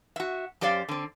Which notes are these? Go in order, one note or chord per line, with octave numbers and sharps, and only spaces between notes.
F#4 E5
F#2 G4 C5 D5 F5
D3 C4